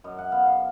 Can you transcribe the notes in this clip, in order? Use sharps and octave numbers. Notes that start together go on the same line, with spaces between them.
F#2 D#5
F#5
B3 F5
F5